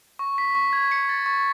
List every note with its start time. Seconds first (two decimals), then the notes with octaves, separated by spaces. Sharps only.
0.19 C#6
0.38 B6
0.55 C#6
0.73 G#6
0.91 C#7
1.09 A6
1.26 C#6